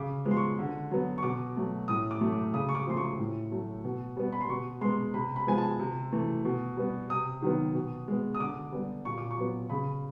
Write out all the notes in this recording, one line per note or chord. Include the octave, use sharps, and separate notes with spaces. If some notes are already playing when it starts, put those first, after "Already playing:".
Already playing: C#3 D6
F3 G#3 B3
C6
C#6
D3
F#3 B3
C#6
B2 D6
F#3 A3
A2 D#6
D6
F#3 A3
D6
C#3 D#6
C#6
D6
F3 A3 C6
C#6
A2
F#3 A3
B2
G3 B3
B5
C6
B2 C#6
G#3 B3 C6
C3 B5
B5
F3 G#3 B3 G#5
A5
C3
E3 A3
B2
G3 B3
C3 D#6
D#3 F#3 B3
B2
G#3 B3
D#6
D3 D6
G3 B3
A#2 C#6
D6
C#6
F#3 B3
C#3 B5